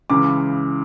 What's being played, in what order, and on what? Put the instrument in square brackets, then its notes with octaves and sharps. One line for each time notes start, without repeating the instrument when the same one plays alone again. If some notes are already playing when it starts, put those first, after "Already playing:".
[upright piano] C#2 C#3 E3 D6